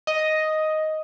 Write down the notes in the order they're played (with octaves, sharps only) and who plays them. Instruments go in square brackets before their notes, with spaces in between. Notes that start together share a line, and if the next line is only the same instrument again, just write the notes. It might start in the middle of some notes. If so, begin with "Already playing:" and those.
[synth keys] D#5